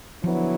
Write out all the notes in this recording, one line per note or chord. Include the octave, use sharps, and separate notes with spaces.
D3 F3 F#3 B3 E4